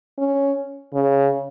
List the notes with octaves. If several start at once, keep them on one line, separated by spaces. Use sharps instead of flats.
C#4
C#3